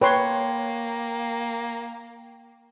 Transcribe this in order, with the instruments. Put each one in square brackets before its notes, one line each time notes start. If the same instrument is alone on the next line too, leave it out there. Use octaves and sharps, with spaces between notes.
[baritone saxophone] A#3 [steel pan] B4 C#5 C6 [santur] G5 C#6